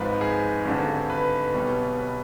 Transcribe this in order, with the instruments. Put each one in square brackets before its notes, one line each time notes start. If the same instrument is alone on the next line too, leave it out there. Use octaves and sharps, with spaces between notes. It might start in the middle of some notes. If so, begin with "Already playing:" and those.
Already playing: [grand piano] G#1 G#2 F3 B4
G#4
G#1 G2 D3
B4
B1 B2 G3
B4